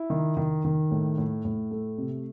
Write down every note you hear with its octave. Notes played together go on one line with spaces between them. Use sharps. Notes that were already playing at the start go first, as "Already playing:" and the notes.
Already playing: E4
D#3
D#3
D#3
A2
A2
A2
A3
C3